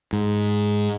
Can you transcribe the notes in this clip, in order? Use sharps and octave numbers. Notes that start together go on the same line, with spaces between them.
G#2